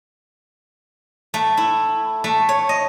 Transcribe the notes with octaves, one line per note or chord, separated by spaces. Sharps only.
A3
E4
A3
C#5
D#5